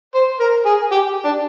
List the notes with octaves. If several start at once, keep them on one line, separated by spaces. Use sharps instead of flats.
C5
A#4
G#4
G4
D4